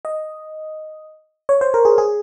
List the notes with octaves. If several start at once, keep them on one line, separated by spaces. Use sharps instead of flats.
D#5
C#5
C5
A#4
G#4
G#4